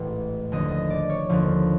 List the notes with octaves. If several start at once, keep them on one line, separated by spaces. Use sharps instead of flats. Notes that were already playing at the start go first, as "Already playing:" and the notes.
Already playing: A1 G#2 E3 B4
D#2 D3 F3 D#5
D#5
D5
C#5
D#2 D3 F3